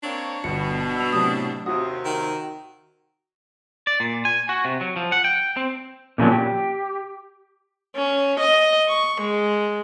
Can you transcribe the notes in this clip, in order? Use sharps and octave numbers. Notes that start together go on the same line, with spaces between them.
A#3 C4 D4 C#5
G1 B2 C#7
E6 F7
A2 C3 F#3 D#6
D#2 C3 F#4 D#6
D#3
D5
A#2
G#5
F#4
C3
F#3
F3
F#5
G5
C4
A#2 C#3 F3 F#3
G4
C#4
D#5
C#6
G#3